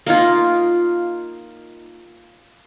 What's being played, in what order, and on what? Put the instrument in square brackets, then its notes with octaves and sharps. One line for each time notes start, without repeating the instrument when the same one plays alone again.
[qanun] A#3 D#4 F4